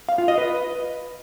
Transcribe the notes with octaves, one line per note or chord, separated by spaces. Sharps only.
F5
F4
D#5
B4